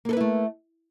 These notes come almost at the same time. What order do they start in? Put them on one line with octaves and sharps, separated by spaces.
A#3 A4 B4 E4 A3